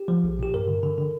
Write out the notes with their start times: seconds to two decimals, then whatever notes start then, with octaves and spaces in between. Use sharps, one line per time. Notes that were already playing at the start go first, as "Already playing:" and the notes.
Already playing: G4
0.08 F3
0.24 A#1
0.39 A#2 G4
0.54 G2 A#4
0.68 D3
0.83 D3
0.98 D3